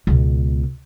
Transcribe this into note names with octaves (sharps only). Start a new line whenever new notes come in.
C#2 B2